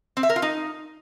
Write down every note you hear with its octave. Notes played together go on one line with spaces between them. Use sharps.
C4
E5
A#4
F4
D#4